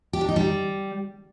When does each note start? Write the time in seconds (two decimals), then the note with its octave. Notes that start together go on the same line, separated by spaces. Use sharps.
0.13 G4
0.21 D4
0.29 D#4
0.36 G3